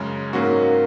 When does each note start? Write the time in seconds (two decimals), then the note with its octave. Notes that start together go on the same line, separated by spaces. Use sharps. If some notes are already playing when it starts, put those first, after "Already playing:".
Already playing: F#2 C#3 G#3 C#4
0.33 G#2 F#3 A#3 C#4 F#4